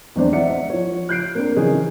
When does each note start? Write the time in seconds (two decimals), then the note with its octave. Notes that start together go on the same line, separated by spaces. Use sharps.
0.16 E2 G#3 C4 D4 C5 D5
0.33 D#4 D5 E5 F#5 C#7
0.70 F3 C#5
1.09 F#6 G6 C7 D7
1.35 A#3 C4 D4 A#4
1.56 C#3 E3 C#4 D#4 G#4